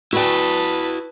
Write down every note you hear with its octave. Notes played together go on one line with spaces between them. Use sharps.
E4 F#4 B4 D5 G5 A5